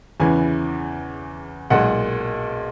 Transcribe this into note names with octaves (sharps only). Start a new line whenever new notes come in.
E2 C#3 E3 G#5
B1 A#2 G#3 F#5